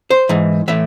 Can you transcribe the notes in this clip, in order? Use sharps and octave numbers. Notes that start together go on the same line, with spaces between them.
C5
G#2 E3
A2 E3 E5